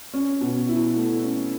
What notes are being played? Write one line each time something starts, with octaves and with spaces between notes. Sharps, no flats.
C#4
B2
E4
A3
C#4